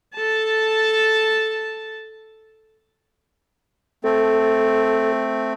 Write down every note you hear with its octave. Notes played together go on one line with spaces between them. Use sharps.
A4 A5
A3 C4 A4